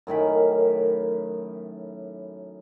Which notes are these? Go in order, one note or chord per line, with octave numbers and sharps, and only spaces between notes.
F#2 A2 D#3 B5